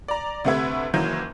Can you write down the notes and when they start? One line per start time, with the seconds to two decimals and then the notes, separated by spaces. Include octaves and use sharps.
0.08 D5 A#5
0.44 D2 C3 A3 B4 E5 G#6
0.94 F#1 D#3 E3 F#3 A#3 G6